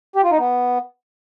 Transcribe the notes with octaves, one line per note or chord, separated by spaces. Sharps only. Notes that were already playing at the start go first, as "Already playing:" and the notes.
G4
F4
D#4
B3